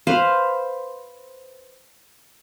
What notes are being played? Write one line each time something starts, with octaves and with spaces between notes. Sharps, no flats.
B4 C5 F5